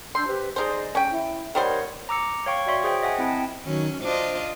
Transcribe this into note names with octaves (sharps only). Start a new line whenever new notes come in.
D4 C6 E6 G6
G4 B4 C5
G#3 D#4 G#4 C5 D5 D#5
C#4 G5
E4
D#3 G3 A#4 C5 C#5 F#5
A#5 D6 E6 C#7
C#5 F5 G5 C#6
F#4 C#5 D5 E5 C6 C#6
G#4 C5 E5 G5
D#5 E5 F#5 G#5
C4 E4 G5 A5
D#3 F#3 C#4
D4 F4 C5 D#5